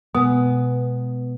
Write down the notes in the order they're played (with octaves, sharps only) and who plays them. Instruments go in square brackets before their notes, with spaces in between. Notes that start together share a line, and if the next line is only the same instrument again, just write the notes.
[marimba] B2 G#3 [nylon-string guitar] B3